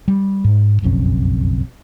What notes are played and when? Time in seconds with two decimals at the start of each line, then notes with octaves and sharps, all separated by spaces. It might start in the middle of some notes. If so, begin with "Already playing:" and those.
0.08 G3
0.44 G#2
0.82 F#1 B1 F2 C#4